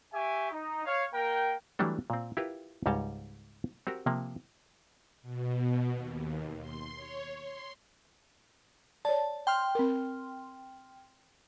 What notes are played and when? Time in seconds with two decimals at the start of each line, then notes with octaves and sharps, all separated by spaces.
0.14 G4 E5 G#5 C#6
0.52 D#4
0.85 C#5 F5
1.14 A#3 A#4 G5
1.79 E3 F#3 G3 A3 D4 A4
2.10 A#2 C4
2.37 E4 F4 G4 A#4 B4
2.86 C#2 G#2 G3 C#5 D#5 A5
3.87 C4 F#4 G4 A#4
4.06 C3 F3 A#3
5.22 B2
5.94 D#2
6.60 C6
6.96 C#5
7.43 C6
9.05 C#5 D5 A5
9.47 G5 C6 F6
9.75 C4 A#4